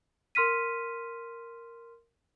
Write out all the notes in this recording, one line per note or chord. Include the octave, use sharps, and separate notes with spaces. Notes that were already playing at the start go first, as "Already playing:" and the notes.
A#4 C6 F6 B6 D#7